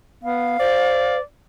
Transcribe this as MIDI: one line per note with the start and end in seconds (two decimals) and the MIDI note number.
0.23 0.56 59
0.23 1.17 77
0.59 1.20 72
0.59 1.21 74